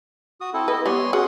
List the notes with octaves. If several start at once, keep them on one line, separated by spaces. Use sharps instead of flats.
F#4 D#6
C4 E4 A4
E4 B4 D#5
G3 B3 C#5 G#5 C6
C#4 F#4 G#4 C6 D#6